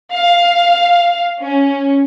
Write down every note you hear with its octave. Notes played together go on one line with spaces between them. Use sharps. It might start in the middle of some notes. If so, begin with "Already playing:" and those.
F5
C#4